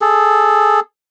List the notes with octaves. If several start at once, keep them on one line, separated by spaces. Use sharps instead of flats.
G#4 A4